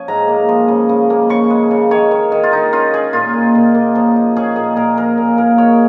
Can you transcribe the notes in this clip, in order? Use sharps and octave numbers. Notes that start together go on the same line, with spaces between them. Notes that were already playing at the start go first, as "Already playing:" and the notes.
Already playing: F3 C#4 G#5
G#2 A#5
A#3
F3
C#3
C#3
A#3
C#3 C#6
G#3
C#3
D#3 C#5
D#3
D#3
F4
D#3 D#4
C#4 F4
C#4 G#4
A#2 F4
A#2
A#2
A#3
F3
D#4
C#4 G#4
A#2 G#4
A#2 A#4
F3 A#4
A#2
A#2 A#4
D#4 C#5